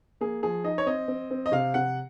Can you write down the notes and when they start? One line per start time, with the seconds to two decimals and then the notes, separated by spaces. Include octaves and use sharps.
0.21 A#3 G#4
0.43 F3 G#4
0.64 D#4 D#5
0.78 C#5
0.86 C4 D#5
1.08 C4
1.31 C4
1.46 D#5
1.52 C3 F5
1.74 C3 F#5